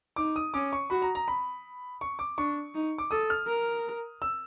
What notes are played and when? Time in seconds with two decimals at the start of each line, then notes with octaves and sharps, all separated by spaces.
0.16 D#4 D6
0.36 D#6
0.54 C#4 D6
0.73 C#6
0.90 F#4 B5
1.02 A#5
1.15 A#5
1.28 B5
2.01 C#6
2.19 D6
2.38 D4 C#6
2.74 D#4
2.98 D6
3.11 A4 D#6
3.30 F6
3.47 A#4
4.22 E6